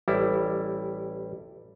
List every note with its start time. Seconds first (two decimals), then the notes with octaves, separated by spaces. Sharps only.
0.08 A1 G3 E4